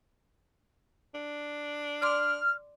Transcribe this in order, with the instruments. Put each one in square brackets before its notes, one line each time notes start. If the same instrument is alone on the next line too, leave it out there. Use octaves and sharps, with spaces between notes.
[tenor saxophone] D4
[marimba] D5 C6 D6 [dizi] F6